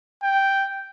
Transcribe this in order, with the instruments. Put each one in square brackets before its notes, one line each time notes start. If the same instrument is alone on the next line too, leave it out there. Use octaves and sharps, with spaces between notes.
[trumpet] G5